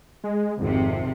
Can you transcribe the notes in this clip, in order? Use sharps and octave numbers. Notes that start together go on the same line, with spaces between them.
G#3
G#1 F2 C3